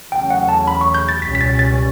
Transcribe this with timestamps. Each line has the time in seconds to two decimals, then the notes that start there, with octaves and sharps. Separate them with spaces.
0.12 E2 C#3 F#3 A3 C#4 G5
0.30 F#5
0.49 A5
0.68 B5
0.81 C#6
0.95 G6
1.09 A6
1.22 C#2 B2 G3 C#4 B6
1.35 B6
1.41 A6
1.59 A6